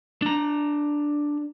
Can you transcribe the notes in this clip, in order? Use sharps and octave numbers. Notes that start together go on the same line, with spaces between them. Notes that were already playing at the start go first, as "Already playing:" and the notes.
D4 A#5